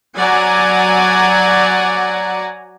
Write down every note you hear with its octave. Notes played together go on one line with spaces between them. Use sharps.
F#3 D5 F#5 G#5 A#5